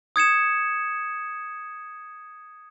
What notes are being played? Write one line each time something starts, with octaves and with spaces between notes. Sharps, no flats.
D#6 G#6 C#7 E7